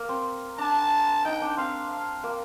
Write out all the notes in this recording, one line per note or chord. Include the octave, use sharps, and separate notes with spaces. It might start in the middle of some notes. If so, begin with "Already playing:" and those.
Already playing: A#3
C4
D4 A5
D#4 G5
D4
C4 F5
F5
A#3